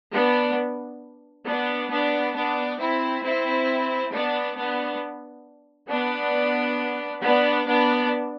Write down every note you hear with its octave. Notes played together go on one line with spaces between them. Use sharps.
B3 D4
B3 D4
B3 D4
B3 D4
C4 E4
C4 E4
B3 D4
B3 D4
B3 D4
B3 D4
B3 D4